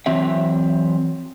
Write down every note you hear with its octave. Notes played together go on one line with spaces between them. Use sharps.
E3 F#3 C4 E5